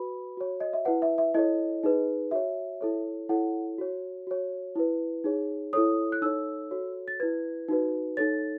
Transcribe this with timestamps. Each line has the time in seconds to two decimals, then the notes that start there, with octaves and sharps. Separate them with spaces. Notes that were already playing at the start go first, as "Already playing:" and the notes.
Already playing: F#4 B4 B5
0.37 F#4 C#5
0.60 D#5
0.73 E5
0.85 E4 B4 F#5
1.02 E5
1.18 E5
1.34 E4 A4 C#5 D#5
1.83 D#4 G#4 B4
2.31 F#4 C#5 E5
2.81 E4 A4 C#5
3.29 E4 A4 C#5 F#5
3.78 F#4 C#5
4.27 F#4 C#5
4.76 E4 B4
5.24 D#4 G#4 C#5
5.73 E4 A4 C#5 D#6
6.12 F#6
6.22 D#4 A4 C#5 E6
6.71 F#4 A4 C#5
7.08 A6
7.20 E4 B4 G#6
7.68 D#4 F#4 B4
8.17 D#4 A4 C#5 A6